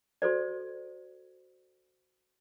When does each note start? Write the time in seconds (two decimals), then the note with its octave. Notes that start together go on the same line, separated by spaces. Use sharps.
0.22 F#4 A4 C5 D5